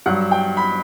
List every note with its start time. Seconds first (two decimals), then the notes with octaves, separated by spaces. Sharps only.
0.06 G2 F#3 F#5
0.31 G5
0.57 B5